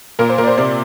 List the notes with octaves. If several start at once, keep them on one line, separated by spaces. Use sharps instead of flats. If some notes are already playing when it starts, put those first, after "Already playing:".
A#2 A#4
C5
A#2 A#4
D5
C5
C3 D5